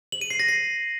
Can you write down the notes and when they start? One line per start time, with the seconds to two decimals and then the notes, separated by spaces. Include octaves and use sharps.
0.12 F#7
0.21 D#7
0.30 C7
0.40 A#6
0.49 C7